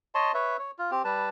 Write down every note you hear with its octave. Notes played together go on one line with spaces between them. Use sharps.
C#5 D#5 A5 C6
B4 C#5 E5
C#5
F4
C4 G4
G3 B4 A5